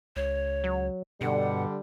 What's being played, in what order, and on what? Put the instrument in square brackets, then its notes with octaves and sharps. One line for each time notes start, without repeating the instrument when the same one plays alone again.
[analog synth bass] C#2 [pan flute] C#5
[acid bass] F#3
[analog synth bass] G2 [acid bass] B2 [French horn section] D3 G3 [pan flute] F#5